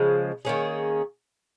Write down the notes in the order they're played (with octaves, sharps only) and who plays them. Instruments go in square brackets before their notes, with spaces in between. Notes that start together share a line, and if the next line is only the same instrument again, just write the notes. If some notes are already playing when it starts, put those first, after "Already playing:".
Already playing: [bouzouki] C#3 F3 G#3
D#3 A#3 C#4 G#4